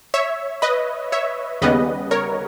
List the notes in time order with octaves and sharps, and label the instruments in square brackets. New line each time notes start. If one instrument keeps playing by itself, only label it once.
[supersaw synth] C#5 E5
B4 D#5
C#5 E5
D#2 C#3 G3 B3 B4 D#5
A#4 C#5